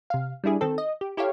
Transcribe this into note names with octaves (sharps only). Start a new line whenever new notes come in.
C3 F5
G3 D4 E4 G#4
D#3 C4 A4
D#5
G4
E4 G4 A4 C#5 F5